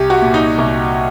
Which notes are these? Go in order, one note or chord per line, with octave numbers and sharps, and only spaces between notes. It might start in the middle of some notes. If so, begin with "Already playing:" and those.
Already playing: C2 G4
F#4
A#2
D#4
C2